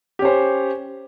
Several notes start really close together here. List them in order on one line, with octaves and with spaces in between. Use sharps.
G4 C#4 C5